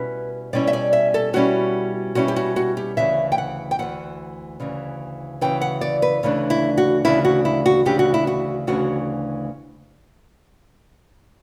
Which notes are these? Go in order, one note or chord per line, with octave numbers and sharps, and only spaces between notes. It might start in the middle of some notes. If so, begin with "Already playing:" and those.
Already playing: B2 G3 C#4 E4 B4
B2 G3 C#4 E4 D5
E5
D5
E5
A4
B2 G3 C#4 E4 F#4
B2 G3 C#4 E4 F#4
G4
F#4
F#4
G4
D2 C#3 E3 E5
G5
F#5
G5
D2 C#3 E3 F#5
D2 C#3 E3
D2 C#3 E3 G5
F#5
D5
B4
D2 C#3 E3 A3 D4
E4
F#4
D2 C#3 E3 A3 D4 E4
F#4
E4
F#4
D2 C#3 E3 A3 D4 G4
F#4
E4
F#4
D2 C#3 E3 A3 D4 F#4